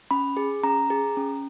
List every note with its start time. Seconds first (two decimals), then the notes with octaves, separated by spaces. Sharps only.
0.11 C#4 B5
0.37 G#4
0.63 C#4 A#5
0.90 G#4
1.17 C#4